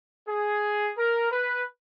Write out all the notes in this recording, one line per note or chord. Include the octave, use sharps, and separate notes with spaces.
G#4
A#4
B4